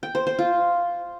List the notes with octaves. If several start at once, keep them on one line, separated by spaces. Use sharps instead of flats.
G5
C5
C5
F4